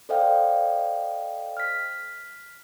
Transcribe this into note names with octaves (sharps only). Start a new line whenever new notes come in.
A4 C5 D5 D#5 F5 G5
F6 B6